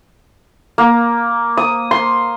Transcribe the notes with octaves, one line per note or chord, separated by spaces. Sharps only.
A#3
D#6
C6